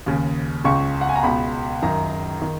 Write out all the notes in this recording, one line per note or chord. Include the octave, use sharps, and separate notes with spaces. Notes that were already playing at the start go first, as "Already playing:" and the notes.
D#2 C#3
C#2 C#3 C#6
F#5
G#5
A#5
C#2 B2 B5
F#2 D#3 A#5
D#3